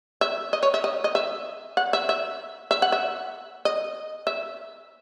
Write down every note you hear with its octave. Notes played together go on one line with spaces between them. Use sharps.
E5
D#5
C#5
E5
D#5
D#5
E5
F#5
E5
E5
E5
F#5
E5
D#5
E5